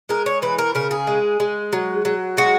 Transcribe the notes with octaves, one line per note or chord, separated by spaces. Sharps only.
G#3 A#4
C#5
E3 B4
A#4
C#3 A#4
G#4
G#3
G#3
F#3
F#3
G#3 F#4